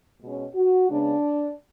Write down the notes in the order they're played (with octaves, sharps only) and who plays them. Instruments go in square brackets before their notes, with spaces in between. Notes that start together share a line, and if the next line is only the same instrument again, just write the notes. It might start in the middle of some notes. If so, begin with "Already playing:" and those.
[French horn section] B2 G#3 C#4
F#4
C#3 G#3 B3 D4